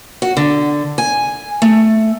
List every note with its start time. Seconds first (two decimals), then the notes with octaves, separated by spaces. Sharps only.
0.22 F#4
0.37 D3
0.98 G#5
1.62 A3